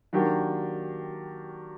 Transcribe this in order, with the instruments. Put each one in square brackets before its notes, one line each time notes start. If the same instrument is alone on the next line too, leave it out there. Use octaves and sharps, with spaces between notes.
[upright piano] D#3 F#3 A#3 D4 G4